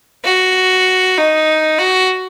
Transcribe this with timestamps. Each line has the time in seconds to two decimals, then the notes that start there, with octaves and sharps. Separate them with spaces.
0.24 F#4
1.18 D#4
1.79 F#4